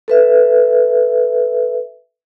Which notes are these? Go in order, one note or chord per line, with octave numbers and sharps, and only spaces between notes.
A4 B4 E5